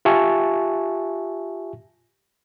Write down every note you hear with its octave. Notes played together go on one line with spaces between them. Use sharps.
F4 G4 E5 G#5 A5 C#6